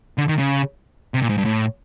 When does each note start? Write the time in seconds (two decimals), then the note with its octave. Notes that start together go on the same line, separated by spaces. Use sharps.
0.18 D3
0.28 D#3
0.39 C#3
1.14 C3
1.22 A#2
1.30 G#2
1.38 G2
1.45 A2